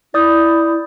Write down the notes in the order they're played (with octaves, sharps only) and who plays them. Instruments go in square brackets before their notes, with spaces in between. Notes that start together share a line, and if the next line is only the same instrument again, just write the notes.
[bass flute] E4 [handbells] D5 D#6 G6